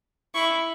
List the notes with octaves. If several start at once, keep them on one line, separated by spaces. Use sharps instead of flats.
E4 C#6